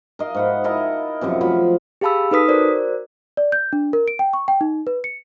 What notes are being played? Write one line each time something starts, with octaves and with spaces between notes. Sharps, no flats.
A#4 D#5 F5
G#2 F#5 B5
E4 A#4 D#5 A5
F#2 C3 F3 F#3
F3 F#3 A3 B5
G4 G#4 F5 A5 B5 E6
D#4 A4 B4 D#6 B6
F#4 A#4 C5 D5
D5
G6
D4
A#4
D7
G5
C#6
G5
D#4
B4
C#7